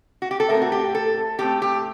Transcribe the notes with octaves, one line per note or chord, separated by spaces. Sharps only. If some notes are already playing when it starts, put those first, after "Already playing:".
F#4
G4
A4
A2 A3 C4 A#4
F#4
G4
A4
A2 A3 C4 G4
G4